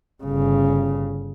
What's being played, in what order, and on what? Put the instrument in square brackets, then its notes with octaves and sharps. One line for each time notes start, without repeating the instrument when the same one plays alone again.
[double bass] G1 C#3